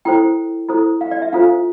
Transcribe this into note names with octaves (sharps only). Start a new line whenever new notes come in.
E4 A4 C5 G5
E4 A4 C5
F5
D5
E5
D4 F4 A4 C5 F5